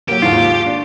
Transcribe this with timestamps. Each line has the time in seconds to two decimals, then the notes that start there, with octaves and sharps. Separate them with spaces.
0.08 F#3 A#3 G4
0.22 D#2 G#2 F4
0.66 D4